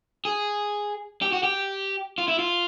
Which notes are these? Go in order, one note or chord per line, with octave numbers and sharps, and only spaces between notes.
G#4
G4
F#4
G4
F4
E4
F4